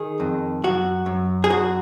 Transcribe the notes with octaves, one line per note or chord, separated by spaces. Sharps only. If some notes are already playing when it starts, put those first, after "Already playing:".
Already playing: D#3 G#4
F2
F#2 F#4
F#2
G#4
F#2 F#4